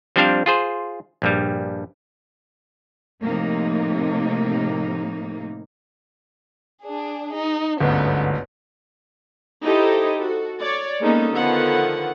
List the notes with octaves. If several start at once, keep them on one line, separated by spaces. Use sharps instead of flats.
F3 G3 C4 D4 C5 F5
F4 G#4 C5
A#1 G2 G3
A2 C3 F3 A#3 D#4
D4 G#4
D#4
G1 D2 G#2 B3 C#4
D#4 E4 G4 A4 C5 D#5
F#4 A4
C#5 D5
G#3 A#3 B3 C#4 D#4 A4
D3 D#3 F3 B3 A4 F#5